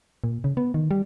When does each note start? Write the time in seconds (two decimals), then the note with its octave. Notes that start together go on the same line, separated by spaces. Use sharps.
0.24 A#2
0.44 C#3
0.57 B3
0.74 D#3
0.91 G3